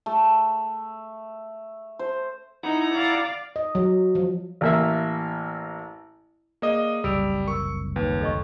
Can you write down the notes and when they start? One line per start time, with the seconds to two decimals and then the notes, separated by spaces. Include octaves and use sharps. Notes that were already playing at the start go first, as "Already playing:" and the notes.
0.06 A3
1.99 C5
2.63 D#4 E4 F#5 A#5
2.95 D5 F5
3.56 D#5
3.75 F#3
4.15 F3
4.61 A1 A#3 E5
6.62 A#3 G#4 D5 D#5 D#6
7.04 F#1 C2 G3 E6 D7 F7
7.48 A#4 C#6 E6
7.96 D#2 B4
8.21 A4 D#5 C#6